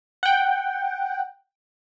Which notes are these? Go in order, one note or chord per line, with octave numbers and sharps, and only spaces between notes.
F#5 G5